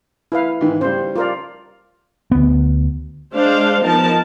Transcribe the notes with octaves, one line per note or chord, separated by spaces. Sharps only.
E4 B4 F5
G#2 D#3 E3
C#3 G3 C5
F4 A#4 D5
D2 B3
G#3 D4 C5 F5
F3 B3 D#4 A#4 A5